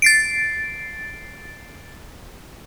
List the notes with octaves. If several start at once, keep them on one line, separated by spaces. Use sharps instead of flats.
A6 C7 D7